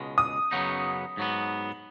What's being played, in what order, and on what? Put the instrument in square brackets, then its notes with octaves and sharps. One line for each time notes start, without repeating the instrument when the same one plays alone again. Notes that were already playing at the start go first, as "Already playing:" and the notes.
Already playing: [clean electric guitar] C#2 B2 G#3
[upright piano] D#6
[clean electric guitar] F#2 C#3 F#3 B3 D#4
G#2 F#3 B3